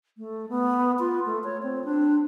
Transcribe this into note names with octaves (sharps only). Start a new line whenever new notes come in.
A3
B3
F4
A3
C#5
C4
D4